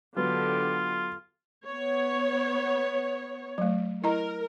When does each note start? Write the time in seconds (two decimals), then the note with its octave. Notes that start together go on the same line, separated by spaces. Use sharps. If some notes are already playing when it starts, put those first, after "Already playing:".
0.17 D3 F#3 B3 F4 G4
1.65 B3 C#5
3.58 F#3 A3
4.04 E4 A#4 D#5 A#5